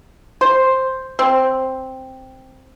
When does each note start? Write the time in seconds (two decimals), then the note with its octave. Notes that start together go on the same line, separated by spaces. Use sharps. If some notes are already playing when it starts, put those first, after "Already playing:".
0.41 C5
1.19 C4